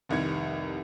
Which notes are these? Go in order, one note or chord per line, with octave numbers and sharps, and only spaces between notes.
F1 C2 D#3 G#6 C#7